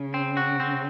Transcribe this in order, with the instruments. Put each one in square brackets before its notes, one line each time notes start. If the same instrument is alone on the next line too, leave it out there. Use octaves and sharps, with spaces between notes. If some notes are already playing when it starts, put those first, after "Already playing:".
Already playing: [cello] C#3
[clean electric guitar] C4
F#4
C4